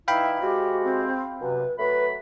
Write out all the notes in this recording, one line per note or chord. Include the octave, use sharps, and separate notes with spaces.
E3 D#4 E4 E5 F5 G5 B5
C3 G#3 F#4 G4
C4
F#2 C3 B4
F#3 A3 B4 B5